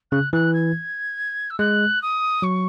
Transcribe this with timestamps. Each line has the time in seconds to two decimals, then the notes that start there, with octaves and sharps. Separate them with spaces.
0.11 C#3 F#6
0.33 E3 F#6
0.53 G#6
1.50 E6
1.58 G#3 F#6
2.01 D#6
2.42 F#3 C#6